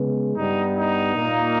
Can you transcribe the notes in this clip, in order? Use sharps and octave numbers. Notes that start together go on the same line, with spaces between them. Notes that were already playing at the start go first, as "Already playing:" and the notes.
Already playing: C#3 G#3 B3
G2 G3 B3 D#4
D#4
A#2 A#3